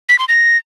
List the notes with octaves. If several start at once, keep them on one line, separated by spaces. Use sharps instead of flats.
B6
C6
A#6